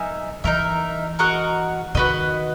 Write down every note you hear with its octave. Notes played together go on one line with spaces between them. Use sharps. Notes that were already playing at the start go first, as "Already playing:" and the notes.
Already playing: F#3 D#4 A#4 E5 G#5
E3 D#4 A#4 E5
F#4 A#4 D#5 F#5
D#3 F#4 B4 D#5